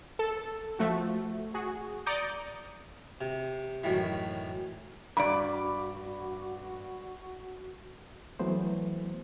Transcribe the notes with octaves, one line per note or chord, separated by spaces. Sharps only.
A4
F3 A3 F#4
F#4 G#4
D5 A#5 D6 D#6 G6 C#7
C3
F#2 A2 D#3 E3
G2 F#4 D5 B5 D6
E3 F#3 A3 B3 C5